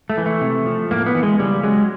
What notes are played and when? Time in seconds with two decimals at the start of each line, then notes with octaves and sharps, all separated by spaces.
0.10 A3
0.18 E3
0.26 A3
0.41 C3
0.66 F3
0.91 A2 A#3
1.06 B3
1.15 E3
1.23 G#3
1.39 C#3 G3
1.63 F#3 G#3